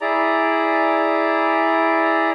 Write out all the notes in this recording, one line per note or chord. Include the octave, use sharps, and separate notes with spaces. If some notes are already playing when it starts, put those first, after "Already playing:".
E4 G#4 D5 A#5